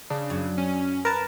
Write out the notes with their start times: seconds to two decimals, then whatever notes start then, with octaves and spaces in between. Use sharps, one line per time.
0.10 C#3 D4
0.30 F#2
0.58 C#4
1.05 A#4 B4 A5